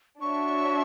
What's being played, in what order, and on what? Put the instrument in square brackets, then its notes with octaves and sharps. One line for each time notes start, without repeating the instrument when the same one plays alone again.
[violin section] D4 F#4 C#5 E5 [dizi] C#6